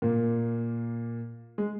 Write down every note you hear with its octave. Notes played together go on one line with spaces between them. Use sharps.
A#2 A#3
G#3